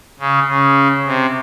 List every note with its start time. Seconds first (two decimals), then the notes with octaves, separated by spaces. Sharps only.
0.20 C#3
0.48 C#3
1.06 C3